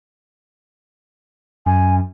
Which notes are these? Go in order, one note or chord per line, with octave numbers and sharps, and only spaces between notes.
F#2 G#5